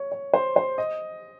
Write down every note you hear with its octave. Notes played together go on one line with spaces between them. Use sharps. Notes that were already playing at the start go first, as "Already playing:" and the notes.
Already playing: C#5
C#5
C5
C5
D#5